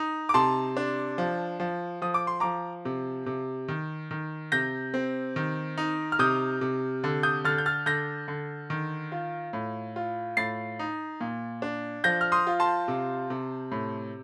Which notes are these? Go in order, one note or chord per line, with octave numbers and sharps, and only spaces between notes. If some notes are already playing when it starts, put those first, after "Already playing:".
Already playing: D#4
D6
C3 A5 C6
D4
F3
F3
F3 D#6
D6
C6
F3 A#5 D6
C3
C3
D#3
D#3
C3 G6 A#6
C4
D#3
D#4
F6
C3 D#6 G6
C3
D3
D#6 G6
D3 F6 A6
G6
F6 A6
D3 G6 A#6
D3
D#3
F4
A2
F4
A2 A6 C7
D#4
A#2
D4
F3 G6 A#6
F6
C6 D#6
F4
A5 C6
C3
C3
A2